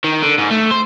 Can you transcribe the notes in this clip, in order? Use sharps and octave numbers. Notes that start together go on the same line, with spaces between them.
D#3
D3
G#2
A3
C5